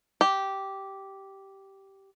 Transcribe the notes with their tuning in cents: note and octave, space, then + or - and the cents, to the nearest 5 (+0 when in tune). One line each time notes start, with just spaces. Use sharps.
G4 -10